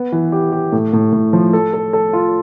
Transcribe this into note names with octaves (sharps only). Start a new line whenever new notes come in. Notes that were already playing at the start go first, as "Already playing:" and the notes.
Already playing: B3
E3
G4
G4
A2
A2
A2
F3
A4
A4
A4
F4